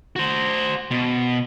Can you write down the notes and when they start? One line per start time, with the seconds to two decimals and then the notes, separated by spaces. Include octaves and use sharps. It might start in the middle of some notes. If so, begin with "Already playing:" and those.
0.16 F#4 C5
0.91 B2